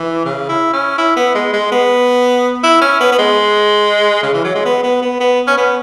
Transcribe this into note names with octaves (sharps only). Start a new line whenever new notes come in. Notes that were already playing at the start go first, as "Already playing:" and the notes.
Already playing: E3
C#3
E4
C#4
E4
B3
G#3
G#3
B3
E4
C#4
B3
B3
G#3
C#3
E3
F#3
G#3
B3
B3
B3
B3
C#4
B3